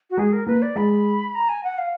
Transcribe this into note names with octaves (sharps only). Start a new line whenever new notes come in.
F#4
G#3 G#4
A#4
A#3 B4
D5
G#3 B5
A#5
G#5
F#5
F5